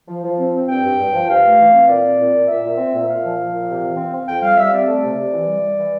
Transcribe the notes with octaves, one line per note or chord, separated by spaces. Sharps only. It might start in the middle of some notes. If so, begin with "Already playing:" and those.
F3
F3
C4
C4
G2 G5
G2
G2
F3
G2 F5
A3
E3
C4
A#2 D5
C4
A#2
A#2
A#2 E5
A#2
C4
A#2
A#2 F5
F3
F3
A#2
C3
E3
C4
C4
F2 G5
G3 F5
G3 E5
C4 D5
A3
C3
C3
E3
G3
G3
E3